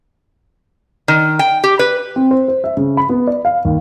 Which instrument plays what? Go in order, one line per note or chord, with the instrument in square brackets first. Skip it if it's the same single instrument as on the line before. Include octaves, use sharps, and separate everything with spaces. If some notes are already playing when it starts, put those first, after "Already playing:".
[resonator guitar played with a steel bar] D#3
G5
G4
B4
[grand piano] C4
C5
C5
E5
C#3
B5
B3
D5
F5
D#2